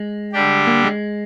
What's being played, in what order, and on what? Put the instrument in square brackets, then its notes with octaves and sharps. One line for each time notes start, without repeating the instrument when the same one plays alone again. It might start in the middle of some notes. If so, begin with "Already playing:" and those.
Already playing: [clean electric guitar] G#3
[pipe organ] D3 G3 D4 G4
[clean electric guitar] A#3
G#3